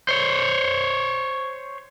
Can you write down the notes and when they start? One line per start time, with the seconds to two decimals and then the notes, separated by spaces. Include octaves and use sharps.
0.09 C5 C#5